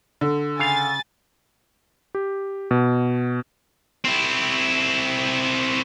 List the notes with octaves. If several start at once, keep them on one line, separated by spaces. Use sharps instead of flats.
D3
C#3 F5 G#5 A6
G4
B2
C4 E4